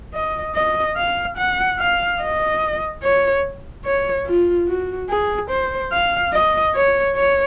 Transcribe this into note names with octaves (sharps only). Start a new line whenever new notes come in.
D#5
D#5
F5
F#5
F5
D#5
C#5
C#5
F4
F#4
G#4
C5
F5
D#5
C#5
C#5